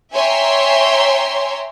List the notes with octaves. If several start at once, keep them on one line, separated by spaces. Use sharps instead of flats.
C#5 E5 G5 G#5 A#5 C6